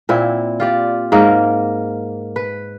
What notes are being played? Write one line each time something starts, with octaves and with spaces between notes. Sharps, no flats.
A#2 C4 E4
F4 G4 D5
G#2 A#3 A#4
B4